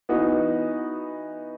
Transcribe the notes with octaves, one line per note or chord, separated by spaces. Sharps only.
E3 B3 D#4 F#4